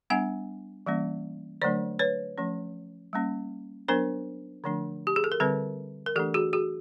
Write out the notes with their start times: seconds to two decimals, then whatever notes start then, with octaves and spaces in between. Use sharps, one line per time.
0.10 G3 B3 D4 F#5 G#5
0.86 E3 G3 A#3 C#4
1.62 D3 F#3 A3 D4 C5 D5
1.99 B4 C#5
2.38 F3 A3 C#4
3.13 G3 A#3 C#4
3.88 F#3 B3 D4 A#4 C5
4.64 D3 F3 A3 D4
5.07 G4
5.16 G#4
5.24 A4
5.32 A#4
5.40 D3 G3 C4 A4 B4
6.06 A#4
6.16 E3 A3 D4 G4 A4
6.34 F#4 G#4
6.53 F#4 G#4